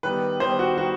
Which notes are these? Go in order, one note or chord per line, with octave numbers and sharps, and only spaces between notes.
D#3 G3 B3 B4
D#3 G3 B3 C5
F#4
D#3 G3 B3 F#4